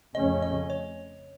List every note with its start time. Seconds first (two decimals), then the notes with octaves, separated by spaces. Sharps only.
0.15 F2 C#3 A3 C#4 D#5
0.42 D#5
0.70 C#5